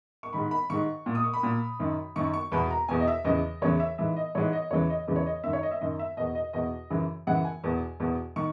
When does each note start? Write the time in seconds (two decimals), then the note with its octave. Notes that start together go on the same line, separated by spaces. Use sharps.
0.23 C#6
0.33 G#2 D#3 B5
0.51 B5
0.70 G#2 D#3 C#6
1.06 A#2
1.15 D#6
1.24 C#6
1.33 B5
1.43 A#2
1.80 F#2 D#3
2.16 F#2 D#3 C#6
2.33 C#6
2.52 E2 B2 B5
2.70 A#5
2.88 E2 B2 G#5
3.00 D#5
3.08 E5
3.25 E2 C#3 E3 D#5
3.62 E2 C#3 E3 C#5
3.80 E5
3.98 G#2 E3 E5
4.16 D#5
4.35 G#2 E3 C#5
4.53 D#5
4.71 E2 C#3 E3 C#5
4.90 D#5
5.08 E2 C#3 E3
5.16 C#5
5.26 D#5
5.44 F#2 D#3 E5
5.53 C#5
5.63 D#5
5.71 E5
5.81 F#2 D#3 D#5
5.99 E5
6.17 E2 B2 D#5
6.35 D#5
6.53 E2 B2 D#5
6.90 F#2 C#3 E3
7.27 F#2 C#3 E3 F#5
7.45 G#5
7.64 E2 B2
8.00 E2 B2
8.36 D#3 C#6